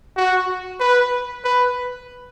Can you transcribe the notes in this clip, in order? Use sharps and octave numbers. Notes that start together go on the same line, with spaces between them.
F#4
B4
B4